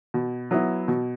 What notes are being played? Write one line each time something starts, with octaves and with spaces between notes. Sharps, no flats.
B2
F#3 B3 E4
B2